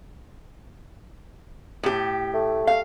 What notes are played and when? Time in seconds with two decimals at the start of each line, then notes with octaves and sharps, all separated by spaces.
1.83 A2 G4
2.34 A3
2.67 F5